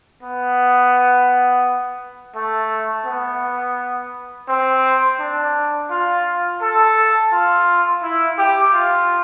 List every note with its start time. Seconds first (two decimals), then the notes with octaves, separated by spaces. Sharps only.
0.23 B3
2.36 A3
3.06 B3
4.49 C4
5.20 D4
5.91 F4
6.62 A4
7.32 F4
8.03 E4
8.38 G4
8.74 F4